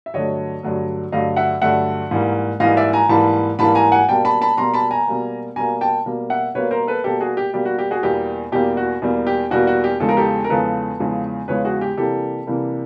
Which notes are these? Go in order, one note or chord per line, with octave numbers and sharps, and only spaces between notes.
E5
G2 D3 F#3 A3 C#5 D#5
G2 D3 F#3 A3
G2 D3 F#3 A3 D#5 F5
E5 F#5
G2 D3 F#3 A3 E5 F#5
G#2 E3 G3 A#3
G#2 E3 G3 A#3 D#5 F5
D5 E5
G#5 A#5
G#2 E3 G3 A#3 A5 B5
G#2 E3 G3 A#3 A5 B5
G#5 A#5
F#5 G#5
B2 G3 A#3 G5 A5
A5 B5
A5 B5
B2 G3 A#3 A#5 C6
A5 B5
G#5 A#5
B2 G3 A#3
B2 G3 A#3 G#5 A#5
G5 A5
B2 G3 A#3
E5 F#5
B2 G3 A#3 B4 C#5
A#4 C5
A4 B4
B2 G3 A#3 G4 A4
F#4 G#4
G4
B2 G3 A#3 G4
F#4
G4
F#4 G#4
E2 B2 G3 A#3 G4
E2 B2 G3 A#3 G4
F#4
E2 B2 G3 A#3
G4
E2 B2 G3 A#3 F#4
F#4
G4
E2 C#3 F3 G#3 A4
A#4
G4 A4
A#4
E2 C#3 F3 G#3 A4 B4
E2 C#3 F3 G#3
E2 C#3 F3 G#3 B4 C#5
F#4 G#4
G4
C3 E3 G3 A#3 G4 A4
C3 E3 G3 A#3